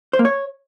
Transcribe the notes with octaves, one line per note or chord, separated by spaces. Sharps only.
C5
A#3
C#5